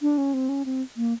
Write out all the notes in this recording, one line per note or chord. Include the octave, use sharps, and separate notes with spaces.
D4
C#4
C4
C#4
C4
A#3